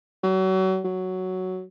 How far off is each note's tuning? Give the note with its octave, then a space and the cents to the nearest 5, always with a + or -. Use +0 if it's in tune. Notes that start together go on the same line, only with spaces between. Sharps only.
F#3 +35
F#3 +5